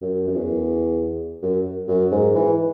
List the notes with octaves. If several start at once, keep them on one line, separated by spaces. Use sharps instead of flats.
F#2
F#2
E2
F#2
F#2
G#2
E3